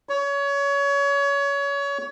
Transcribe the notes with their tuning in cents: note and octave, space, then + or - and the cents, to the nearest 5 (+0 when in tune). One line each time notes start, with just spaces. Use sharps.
C#5 +25